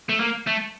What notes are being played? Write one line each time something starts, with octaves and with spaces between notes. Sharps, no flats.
A3
A#3
A3